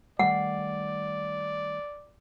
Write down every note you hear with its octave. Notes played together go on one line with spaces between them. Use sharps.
D#3 G3 A3 D5 F#5